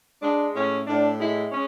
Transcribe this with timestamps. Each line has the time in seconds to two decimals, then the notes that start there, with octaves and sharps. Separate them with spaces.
0.22 G#3 D4
0.54 A2 C#4
0.87 A2 D4
1.19 G#3 E4
1.52 G#3 C#4